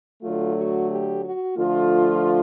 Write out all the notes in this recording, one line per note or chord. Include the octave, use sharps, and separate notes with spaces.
D3 F#3 A3 F4
F#4
G4
F#4
D3 F3 A3 F4